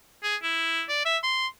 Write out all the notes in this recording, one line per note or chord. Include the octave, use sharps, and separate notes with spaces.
G#4
E4
D5
E5
C6